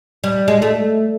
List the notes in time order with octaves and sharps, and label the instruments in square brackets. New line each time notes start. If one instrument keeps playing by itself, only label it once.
[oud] G3
G#3
A3